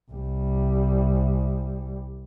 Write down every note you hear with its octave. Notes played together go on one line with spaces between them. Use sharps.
C2 G3